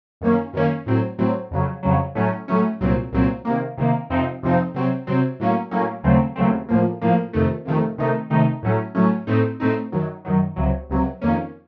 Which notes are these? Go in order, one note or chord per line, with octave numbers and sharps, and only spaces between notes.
F#2 D#3 A#3 C#4
F#2 D#3 A#3 C#4
A2 F#3 C4
A2 F#3 C4
F2 C#3 F#3
F2 C#3 F#3
A2 F#3 A3 C#4
A2 F#3 A3 C#4
C2 A#2 F#3 C4
C2 A#2 F#3 C4
C3 D#3 A#3
C3 D#3 A#3
F2 C3 F3 C4 D#4
F2 C3 F3 C4 D#4
C3 F#3 C4
C3 F#3 C4
A2 F#3 A#3 C#4
A2 F#3 A#3 C#4
D#2 C#3 F#3 A3 C4
D#2 C#3 F#3 A3 C4
A2 F3 A#3
A2 F3 A#3
F2 C3 D#3 A3
F2 C3 D#3 A3
C3 D#3 A3 D#4
C3 D#3 A3 D#4
A2 F#3 A3 C#4
A2 F#3 A3 C#4
A2 A3 C4 D#4
A2 A3 C4 D#4
F#2 D#3 F#3
F#2 D#3 F#3
C#2 C3 F#3
C#2 C3 F#3
F2 D#3 A#3 C#4